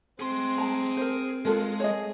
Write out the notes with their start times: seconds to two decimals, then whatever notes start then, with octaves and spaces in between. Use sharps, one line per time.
0.20 C4 G#4 C6
0.58 A5 A#5
0.97 A#4 C5
1.45 G#3 F4 A4 A#4
1.80 G#4 C#5 D#5